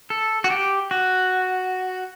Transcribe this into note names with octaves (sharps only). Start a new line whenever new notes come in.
A4
F#4
G4
F#4